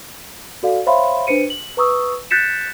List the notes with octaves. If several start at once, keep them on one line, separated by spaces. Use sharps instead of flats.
F#4 A4 D5 F5
C5 C#5 E5 F5 B5 C6
D4 B4 C5 C#7 D#7
F#7
B4 A#5 C#6 D#6 E6
F#6 G6 A6 B6 C#7 E7